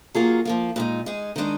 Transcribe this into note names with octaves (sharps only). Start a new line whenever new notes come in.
F#3 A#3 F4 G#4
F3 A#3 F4
A#2 G#3 D#4
G#3 D#4 G#4
D#3 G#3 D4 G#4